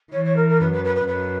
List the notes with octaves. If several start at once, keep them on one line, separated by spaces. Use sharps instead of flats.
E3 C#5
C#5
A#4
A#4
F#2 B4
B4
B4
B4
F#2 B4